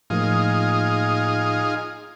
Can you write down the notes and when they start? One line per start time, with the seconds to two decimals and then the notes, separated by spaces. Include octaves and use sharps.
0.10 A2 F3 A#3 D#4 F4 G#4